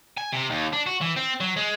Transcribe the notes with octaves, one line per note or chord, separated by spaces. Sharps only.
G#5
C3
D#2
D4
F#4
E3
C4
F#3
G#3